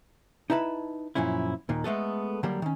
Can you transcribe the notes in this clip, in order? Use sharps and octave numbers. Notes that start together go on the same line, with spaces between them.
D#4 E4 B4 A5 B5
F#2 A#2 F3 C#4 E4
D#2 A#2 D#3
G#3 A3 B3 A4
D3 F#3 G3 A#3
D#3 C#4